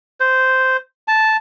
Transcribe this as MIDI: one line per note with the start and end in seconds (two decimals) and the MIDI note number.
0.20 0.77 72
1.08 1.37 81